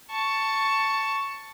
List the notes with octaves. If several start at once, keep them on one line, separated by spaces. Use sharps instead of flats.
A5 C#6